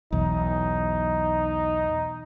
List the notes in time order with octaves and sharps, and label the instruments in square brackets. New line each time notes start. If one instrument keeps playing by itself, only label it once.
[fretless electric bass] B1 E2 [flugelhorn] D#4